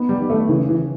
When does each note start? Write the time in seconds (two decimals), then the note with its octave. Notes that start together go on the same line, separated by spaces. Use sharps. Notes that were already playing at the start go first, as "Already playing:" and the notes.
Already playing: B3 D#4
0.09 G3
0.19 D#3
0.30 A3
0.49 C#3 E3
0.69 E3